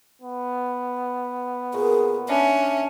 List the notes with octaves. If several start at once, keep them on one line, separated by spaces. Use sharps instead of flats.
B3
A#2 G#4 C#6
C#4 D4 E5